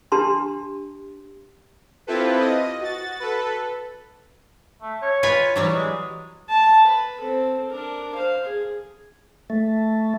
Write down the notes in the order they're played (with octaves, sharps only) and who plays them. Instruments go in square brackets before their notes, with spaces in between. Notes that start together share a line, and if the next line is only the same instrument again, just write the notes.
[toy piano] D4 G4 A5 C6
[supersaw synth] C4 E4 F4 G4 A4 B4
D#5
F#4 A6
A4 B4
[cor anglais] A3
C#5
[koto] F4 B4 G#5
E3 F#3 G3
[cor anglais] G#3
[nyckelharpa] A5
B4
C4 A4
D4 A#4
C5 F5
G#4
[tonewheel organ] A3